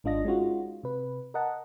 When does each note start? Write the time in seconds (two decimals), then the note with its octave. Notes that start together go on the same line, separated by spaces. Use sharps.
0.04 G#1 G#2 D4 F4 D#5 A#6
0.25 G#3 C#4 D#4 F4 F#4
0.83 C3 B4
1.34 A#4 D#5 F#5 A5